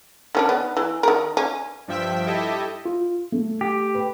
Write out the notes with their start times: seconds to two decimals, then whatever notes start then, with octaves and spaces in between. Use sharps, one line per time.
0.35 D#3 C#4 D4
0.49 B3
0.77 E3
1.03 D#3 A#4
1.37 C#4
1.88 G2 F3 E5 G5 E6 B6
2.26 E4 G4 A4 D#5 E5
2.85 F4
3.32 A3
3.61 G4
3.94 B4